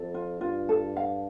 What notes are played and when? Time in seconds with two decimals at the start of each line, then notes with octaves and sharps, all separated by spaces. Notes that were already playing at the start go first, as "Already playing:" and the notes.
Already playing: F2 A4
0.14 F4
0.41 G2 F4
0.69 A4
0.97 F5